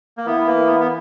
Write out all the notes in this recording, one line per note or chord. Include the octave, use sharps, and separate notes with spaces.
A#3
E3 B3
A#3
B3
B3